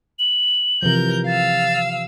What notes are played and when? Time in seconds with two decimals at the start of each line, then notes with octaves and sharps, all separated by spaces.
0.19 F#7
0.83 C3 E3 F3 A#4 G6
1.27 F5 E6 A6